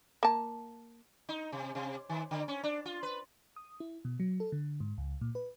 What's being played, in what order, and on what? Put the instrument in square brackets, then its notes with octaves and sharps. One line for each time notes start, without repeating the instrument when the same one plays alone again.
[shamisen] A#3 A5
[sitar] D#4
C3
C3
D#3
D3
C#4
D4
F4
B4
[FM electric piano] D#6
E4
B2
F#3
A4
D3
G#2
C#2
A#2
B4